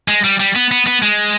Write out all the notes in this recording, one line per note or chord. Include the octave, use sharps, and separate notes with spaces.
G#3
G3
G3
B3
B3
B3
G#3